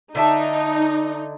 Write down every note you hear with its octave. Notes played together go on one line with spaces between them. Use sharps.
D3 D#4 E5 A5